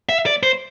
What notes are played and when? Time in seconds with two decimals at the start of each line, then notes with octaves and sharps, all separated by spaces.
0.09 E5
0.26 D5
0.43 C5